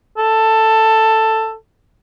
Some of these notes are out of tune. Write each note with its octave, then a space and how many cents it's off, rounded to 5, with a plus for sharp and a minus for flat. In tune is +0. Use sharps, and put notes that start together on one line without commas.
A4 +10